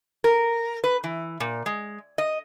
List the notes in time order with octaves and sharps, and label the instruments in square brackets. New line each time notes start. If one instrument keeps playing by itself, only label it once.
[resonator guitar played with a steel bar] A#4
B4
E3
A#2
G#3
D#5